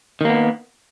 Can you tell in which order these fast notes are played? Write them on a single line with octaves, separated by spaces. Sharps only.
D#3 A#3 B3